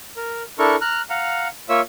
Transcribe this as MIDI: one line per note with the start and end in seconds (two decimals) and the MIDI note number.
0.17 0.43 70
0.59 0.76 62
0.59 0.76 64
0.59 0.76 69
0.59 0.76 70
0.59 0.76 85
0.81 1.02 82
0.81 1.02 89
0.81 1.02 90
1.10 1.48 77
1.10 1.48 78
1.10 1.48 82
1.69 1.81 58
1.69 1.81 65
1.69 1.81 73
1.69 1.81 76
1.69 1.81 88